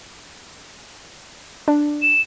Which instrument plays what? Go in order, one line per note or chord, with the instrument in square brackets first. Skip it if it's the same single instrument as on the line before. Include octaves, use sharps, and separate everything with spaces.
[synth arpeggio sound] D4
[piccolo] E7